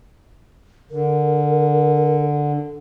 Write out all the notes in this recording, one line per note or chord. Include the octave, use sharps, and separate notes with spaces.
D3 A#4